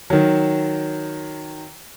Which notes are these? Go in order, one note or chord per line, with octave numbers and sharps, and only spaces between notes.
D#3 F#3